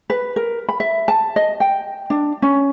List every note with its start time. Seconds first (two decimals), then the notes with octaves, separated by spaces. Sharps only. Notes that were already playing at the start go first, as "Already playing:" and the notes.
0.10 B4
0.36 A#4
0.69 B5
0.80 E5
1.08 A5
1.36 D#5
1.60 G5
2.10 D4
2.42 C#4